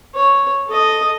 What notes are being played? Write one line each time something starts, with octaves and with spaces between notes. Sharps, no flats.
C#5
A4 D#5